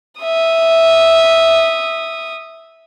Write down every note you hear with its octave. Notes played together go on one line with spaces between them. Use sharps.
E5 D#6